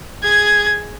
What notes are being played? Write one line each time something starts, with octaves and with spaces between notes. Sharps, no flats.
G#4 G#6